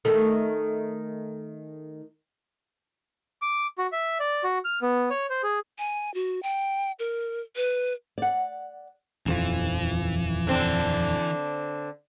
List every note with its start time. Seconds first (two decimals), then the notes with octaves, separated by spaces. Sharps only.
0.05 D#3 A3
3.42 D6
3.78 F#4
3.92 E5
4.20 D5
4.44 F#4
4.65 F6
4.82 B3
5.10 C#5
5.30 C5
5.43 G#4
5.79 G#5
6.14 F#4
6.43 G5
6.99 A#4
7.56 B4
8.18 D5 F#5
9.26 D#1 F2 E3 F3
10.47 D3 C4 D4